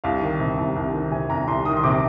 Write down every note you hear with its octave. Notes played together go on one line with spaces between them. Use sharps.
C2 F5
D#3
C3
C2
C2
D#3
C3 G#5
C2 A#5
C2 C6
D#3 D#6
C6
C3 D6